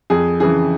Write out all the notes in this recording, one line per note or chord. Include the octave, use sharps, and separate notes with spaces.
F2 G#4
C#3 E3 G#4